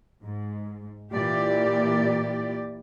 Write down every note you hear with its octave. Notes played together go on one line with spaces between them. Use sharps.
G#2
A#2 E3 G4 D5